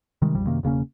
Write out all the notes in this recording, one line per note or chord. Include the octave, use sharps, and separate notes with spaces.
C3 D#3 G3 G#3
A#1 F2 G3
F#2 C3 D#3 A#3
E1 C#3 A#3 C#4